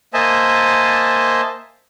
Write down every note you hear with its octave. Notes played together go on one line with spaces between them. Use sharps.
A#3 C5 D#5 E5 G#5 A5